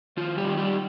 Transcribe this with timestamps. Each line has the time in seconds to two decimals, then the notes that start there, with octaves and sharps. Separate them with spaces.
0.17 D#3 F3 F4
0.37 G3 G4
0.44 D#3
0.58 G3 G4